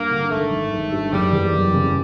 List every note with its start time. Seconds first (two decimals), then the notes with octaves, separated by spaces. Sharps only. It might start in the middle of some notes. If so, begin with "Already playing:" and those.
Already playing: G2 A#3
0.11 D3
0.30 G#1 A3
0.51 G#1
0.72 G#1
0.92 G2
1.12 F#1 G3
1.33 E2
1.53 F#1
1.74 C#3